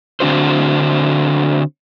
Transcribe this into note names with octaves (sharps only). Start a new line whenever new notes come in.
D3 C4 D4 F#4 C5